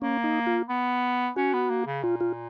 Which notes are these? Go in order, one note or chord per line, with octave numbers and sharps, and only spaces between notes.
A#3 C#4
D#4
F4
B3
C#4 F#4
B3
A#3
C#3
A#2 F4
F4